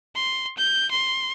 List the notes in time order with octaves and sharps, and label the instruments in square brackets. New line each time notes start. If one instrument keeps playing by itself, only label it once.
[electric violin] C6
G6
C6